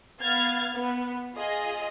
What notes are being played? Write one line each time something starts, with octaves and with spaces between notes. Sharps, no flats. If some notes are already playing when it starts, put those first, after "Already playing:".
B3 F5 F6 G#6 A6
B3
F4 G#4 D#5